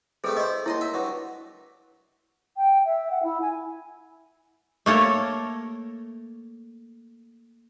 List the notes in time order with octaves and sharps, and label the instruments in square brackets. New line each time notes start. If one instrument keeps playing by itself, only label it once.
[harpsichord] C3 G3 A3 [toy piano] G#4 A4 B4
[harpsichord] E4 C5 [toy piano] D#5
[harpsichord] D#2 D#5 C6 [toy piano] E4
[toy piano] A#4 [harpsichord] E5
[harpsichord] G2 F#3
[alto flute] G5
E5
F#5
E4
G#5
[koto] A3 A#3 A4 A#4 C#5